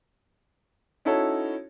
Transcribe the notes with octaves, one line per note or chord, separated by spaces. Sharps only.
C#4 D#4 E4 F#4 A4 C#5